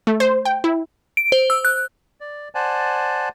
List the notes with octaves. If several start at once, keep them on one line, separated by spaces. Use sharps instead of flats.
A3
C5
G5
E4
D7
C5
E6
F#6
D5
C5 D5 F#5 G#5 A5